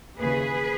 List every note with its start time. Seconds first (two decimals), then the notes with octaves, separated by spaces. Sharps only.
0.20 D#2 C#3 E3 G#4 B4